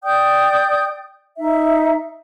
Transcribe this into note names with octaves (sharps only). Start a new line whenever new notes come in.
D5 G5 D#6 G6
D#4 E5